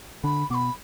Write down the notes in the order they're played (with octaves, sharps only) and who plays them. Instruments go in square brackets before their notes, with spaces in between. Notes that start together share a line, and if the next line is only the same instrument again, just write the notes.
[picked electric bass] D3 D4 [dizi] B5
[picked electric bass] B2 B3 [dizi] D6
[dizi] B5